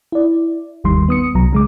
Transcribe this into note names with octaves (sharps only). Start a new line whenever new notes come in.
E4 D5
G1 D#2 D#3 G3 C6
B3 D#6 C#7
C2 B2 F#3 A#5
C#3 G#3 D6